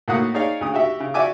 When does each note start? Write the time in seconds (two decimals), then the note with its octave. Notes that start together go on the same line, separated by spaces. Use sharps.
0.08 A2 A#3 F#4 F#5 D#6
0.34 D#4 G#4 C#5 D5 F5
0.61 D2 C#3 D#6
0.74 F#4 G4 E5
1.00 C#3
1.14 F#4 D5 E5 G#5 D6